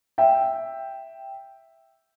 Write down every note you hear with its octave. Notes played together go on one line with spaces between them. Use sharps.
E5 G5